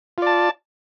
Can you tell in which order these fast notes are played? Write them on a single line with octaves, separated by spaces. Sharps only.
F4 D5 A5